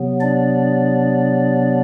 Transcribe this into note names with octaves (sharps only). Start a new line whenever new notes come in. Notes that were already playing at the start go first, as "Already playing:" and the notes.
Already playing: C3 F#3 B3
D4 D5